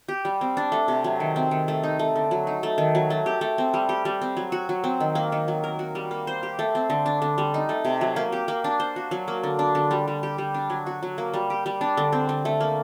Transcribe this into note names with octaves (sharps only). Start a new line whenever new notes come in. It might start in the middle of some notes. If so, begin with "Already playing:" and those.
G4
G3
C4
D4
A3
C3
F#3
D#3
C4
D#3
A3
D#4
A3
D3
F#3
D#4
A3
D#3
F#3
A3
G4
A3
C4
G3
G4
G3
C4
F#3
F#4
F#3
C4
D#3
A#3
D#3
F#3
A#4
F#4
G3
A#3
C5
G4
A3
C4
D3
D4
D3
G3
D#4
A3
C3
F#3
A#3
G4
A#3
D4
C5
F#4
F#3
A#3
D3
D4
D3
G3
G3
G4
G3
D4
F#3
F#4
F#3
A#3
G3
G4
G3
D4
D3
C4
D3
A3
A#3